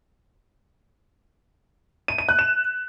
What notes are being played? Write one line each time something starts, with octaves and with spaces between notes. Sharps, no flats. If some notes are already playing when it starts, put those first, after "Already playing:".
D#7
D#7
F#6
E7